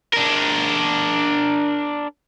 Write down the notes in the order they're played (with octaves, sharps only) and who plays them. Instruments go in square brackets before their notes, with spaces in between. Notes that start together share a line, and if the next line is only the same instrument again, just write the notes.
[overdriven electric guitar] D4 A#4